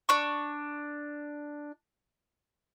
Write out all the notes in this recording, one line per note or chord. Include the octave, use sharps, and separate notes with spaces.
D4 C#6